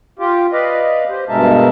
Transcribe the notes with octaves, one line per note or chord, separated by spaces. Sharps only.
F4 G4
B4 D5 D#5 F5
G4 C5
G2 B2 G#3 A#4 E5 A5